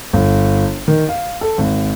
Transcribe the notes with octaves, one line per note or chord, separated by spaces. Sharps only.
G1
D#3
F5
A4
G#1